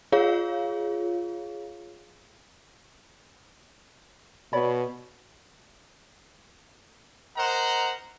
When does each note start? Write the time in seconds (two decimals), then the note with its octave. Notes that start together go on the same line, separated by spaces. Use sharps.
0.12 F4 G#4 C#5 F5
4.53 B2 C#5 D5 B5
7.37 A#4 C5 D#5 F#5 A#5